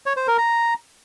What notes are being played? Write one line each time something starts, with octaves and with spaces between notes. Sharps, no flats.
C#5
C5
A#4
A#5